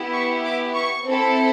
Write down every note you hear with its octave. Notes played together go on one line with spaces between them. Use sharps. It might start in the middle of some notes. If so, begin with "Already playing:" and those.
Already playing: B3 E4 G4
C#6
D6
C#6
C4 E4 A4